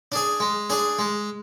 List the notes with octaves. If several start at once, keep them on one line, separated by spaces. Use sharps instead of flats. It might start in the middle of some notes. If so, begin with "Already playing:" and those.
D4 G#4
G#3
D4 G#4
G#3